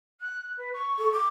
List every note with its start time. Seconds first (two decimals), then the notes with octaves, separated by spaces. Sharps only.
0.20 F#6
0.57 B4
0.73 C#6
0.98 A4
1.12 D6